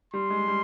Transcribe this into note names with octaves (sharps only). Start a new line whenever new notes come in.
G3 C6
G#3
G3